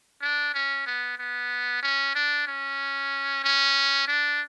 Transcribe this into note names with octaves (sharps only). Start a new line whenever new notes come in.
D4
C#4
B3
B3
C#4
D4
C#4
C#4
D4